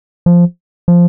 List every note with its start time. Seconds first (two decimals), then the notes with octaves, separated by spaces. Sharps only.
0.26 F3
0.88 F3